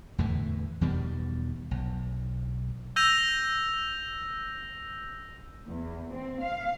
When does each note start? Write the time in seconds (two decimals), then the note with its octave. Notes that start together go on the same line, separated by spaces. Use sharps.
0.18 E2 A2 D3 E3
0.81 E2 B2 D#3 G3
1.71 B1
2.96 E6 G6 A#6 D#7 F7
5.69 E2
6.13 C4
6.42 F5